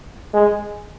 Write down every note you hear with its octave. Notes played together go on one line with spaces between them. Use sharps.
G#3